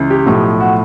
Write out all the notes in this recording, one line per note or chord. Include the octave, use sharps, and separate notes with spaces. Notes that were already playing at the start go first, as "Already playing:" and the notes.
Already playing: C#2 C#3 E3
G4
B1 A2 F3
F#4